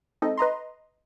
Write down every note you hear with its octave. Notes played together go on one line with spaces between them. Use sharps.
G#3 C4 D#4 A4 D#5
B4 D#5 A#5 C6